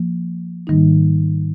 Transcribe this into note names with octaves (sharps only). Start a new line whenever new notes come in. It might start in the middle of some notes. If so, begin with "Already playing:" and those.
Already playing: F3 A#3
G#2 D#3 G3 A#3 D#4